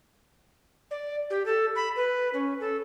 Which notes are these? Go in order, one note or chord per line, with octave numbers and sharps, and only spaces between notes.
D5
G4
A4
B5
B4
C#4
A4